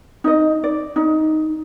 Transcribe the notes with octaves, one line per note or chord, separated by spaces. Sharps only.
D#4 D#5
D5
D#4